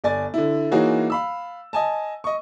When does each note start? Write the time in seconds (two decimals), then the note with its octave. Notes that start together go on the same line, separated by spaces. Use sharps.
0.04 G1 D5 G#5 A6
0.34 D3 E4
0.71 E3 A#3 D#4 F#4 G#4 C#5
1.10 F5 B5 E6
1.73 D#5 G#5 A5
2.24 D#5 C#6